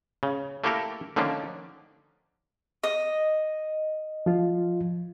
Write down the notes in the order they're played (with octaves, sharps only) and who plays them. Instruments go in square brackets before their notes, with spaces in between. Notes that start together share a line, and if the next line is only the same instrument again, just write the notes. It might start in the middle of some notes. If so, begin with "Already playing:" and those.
[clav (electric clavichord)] C#3
A3 A#3 E4 G4 A4 A#4
D3 D#3 F3 A#3 C#4 D4
[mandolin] D#5
[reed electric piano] F3 F4